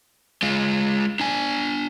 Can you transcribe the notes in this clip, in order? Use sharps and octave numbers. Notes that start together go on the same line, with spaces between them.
G#3 F4
D4 G#5